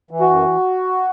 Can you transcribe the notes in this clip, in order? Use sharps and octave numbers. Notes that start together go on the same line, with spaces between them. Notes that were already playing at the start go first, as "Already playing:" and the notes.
E3
F#4
F#2